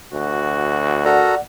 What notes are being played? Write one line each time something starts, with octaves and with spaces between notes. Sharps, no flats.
D2 F#4
F#4 A4 A#4 D5 F#5 A#5